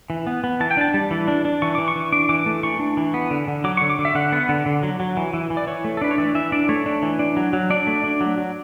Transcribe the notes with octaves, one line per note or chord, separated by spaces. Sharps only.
E3
B3
B3
E3 A5
G5
D4 A5
G3
E3
D4
D4
E3 C#6
E3 D6
C#6
E3
D4 D6
E3 D6
A3
E3 C#6
D4
E3
B3
D3
D3
F#3 D6
D3 C#6
D6
D3
E5
D3 F#5
B3
D3
D3
F#3
F#3
E3
E3
E3
D5
E3 C#5
A3
A4
D4 B4
C#5
E3 D5
E3 E5
D4 D5
A3 C#5
D4
E3
D4
F#3
F#3
D4 D5
A3
D4
F#3
F#3